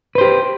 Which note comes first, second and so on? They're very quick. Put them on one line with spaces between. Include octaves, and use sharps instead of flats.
B4 C5 G4